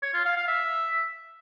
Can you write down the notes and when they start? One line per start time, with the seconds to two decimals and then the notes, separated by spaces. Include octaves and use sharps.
0.03 C#5
0.14 F4
0.25 F5
0.37 F5
0.48 E5